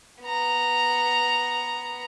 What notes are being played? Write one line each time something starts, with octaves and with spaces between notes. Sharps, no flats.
B3 A#5